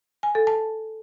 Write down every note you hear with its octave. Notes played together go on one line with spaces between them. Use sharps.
G#5
A4
A5